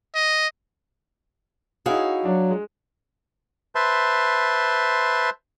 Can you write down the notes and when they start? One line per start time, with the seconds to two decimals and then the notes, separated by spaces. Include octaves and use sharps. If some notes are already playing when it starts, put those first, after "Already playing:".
0.15 D#5
1.86 D#4 E4 F#4 G#4 C#5 F5
2.25 F#3 D4
2.51 G#3
3.75 B4 C5 E5 A5 C6